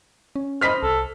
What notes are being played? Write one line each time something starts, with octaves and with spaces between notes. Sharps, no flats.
C#4
C5 D#5 B5 F6 B6
C2 A4